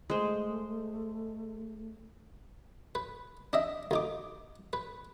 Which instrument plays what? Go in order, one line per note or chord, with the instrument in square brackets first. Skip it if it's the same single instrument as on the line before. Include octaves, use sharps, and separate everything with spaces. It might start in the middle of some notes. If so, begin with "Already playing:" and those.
[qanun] G#3 C5 [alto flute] A3
[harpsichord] B4
D4 D#5 E5
D2 D#4 D6
B4